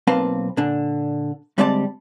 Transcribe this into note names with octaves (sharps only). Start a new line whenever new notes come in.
B1 A#3 C4 B4 F5 A5
A#2 D3 D4
D2 G3 G#3 C4 D5 A5